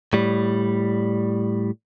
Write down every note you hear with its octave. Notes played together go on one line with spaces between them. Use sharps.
A2 G3